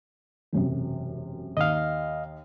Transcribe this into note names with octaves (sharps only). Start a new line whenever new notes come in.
E1 F#2 C3
D#2 D#5 F5